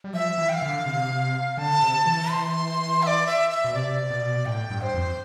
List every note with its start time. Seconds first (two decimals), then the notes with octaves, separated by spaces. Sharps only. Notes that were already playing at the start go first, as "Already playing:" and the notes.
0.04 G3
0.13 F3 E5
0.38 E3
0.49 G5
0.53 F5
0.62 D3
0.86 C3
1.57 D3 A5
1.82 C3
2.06 E3
2.31 C6
3.03 E5
3.07 D5
3.27 E5
3.51 E5
3.64 B2
3.74 C3 D5
4.10 B2
4.46 A2 G5
4.70 G2
4.82 C5
4.94 F2